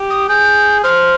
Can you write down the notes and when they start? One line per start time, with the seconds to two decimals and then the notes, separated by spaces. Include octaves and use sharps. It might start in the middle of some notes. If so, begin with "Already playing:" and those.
Already playing: G4
0.10 D#6
0.29 G#4 G6
0.84 C5 F6